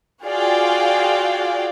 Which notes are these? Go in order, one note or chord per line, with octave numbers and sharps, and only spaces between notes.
F4 F#4 G#4 D5 F5 G5